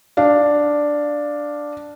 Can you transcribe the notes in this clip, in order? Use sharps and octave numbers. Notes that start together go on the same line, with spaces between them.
D4 F5